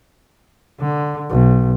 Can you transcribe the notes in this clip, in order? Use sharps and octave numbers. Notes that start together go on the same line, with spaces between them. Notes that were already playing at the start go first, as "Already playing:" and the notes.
D3
B1